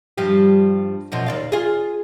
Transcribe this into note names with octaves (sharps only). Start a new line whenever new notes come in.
G2 F3 G3
F#2 B2 F3
D#2 D5 F5
F4 G#4